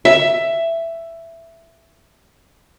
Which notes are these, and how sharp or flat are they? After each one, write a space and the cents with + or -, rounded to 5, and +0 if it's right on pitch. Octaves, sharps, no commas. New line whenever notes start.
E5 +10